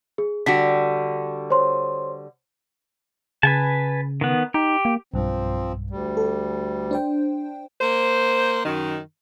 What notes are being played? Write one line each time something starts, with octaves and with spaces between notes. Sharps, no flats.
G#4
D3 G3 F#4 B6
C5 C#5 C6
C#3 B4 G#5 A5
D#3 B3
D#4 G4
A#3
B1 G2 F3 C4
D2 G3
A4
D4 C5 G5
A#3 C5
F#2 D#3